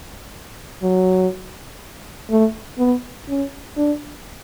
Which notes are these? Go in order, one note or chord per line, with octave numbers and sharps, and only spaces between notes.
F#3
A3
B3
C#4
D4